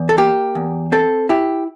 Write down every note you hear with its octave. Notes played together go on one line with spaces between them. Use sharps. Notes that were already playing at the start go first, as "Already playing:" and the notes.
Already playing: E2
A4
A#3 G4
E2
C4 A4
E4 G4